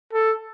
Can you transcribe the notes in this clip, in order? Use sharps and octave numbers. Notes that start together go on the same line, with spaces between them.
A4